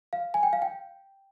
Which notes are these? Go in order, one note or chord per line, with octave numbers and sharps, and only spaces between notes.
F5
G#5
G5
F5
G5